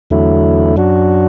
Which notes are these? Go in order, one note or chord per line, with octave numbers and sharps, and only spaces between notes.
E2 D3 F#3 A3 E4
F#2 F#3 D4 F#4